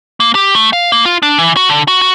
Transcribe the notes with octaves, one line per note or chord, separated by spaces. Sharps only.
A#3
G4
A3
F5
A#3
F4
D4
E3
F#4
D3
F#4
F#4